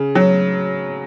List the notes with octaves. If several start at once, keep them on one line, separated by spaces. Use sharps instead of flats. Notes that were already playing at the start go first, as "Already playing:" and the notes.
Already playing: C#3
F#3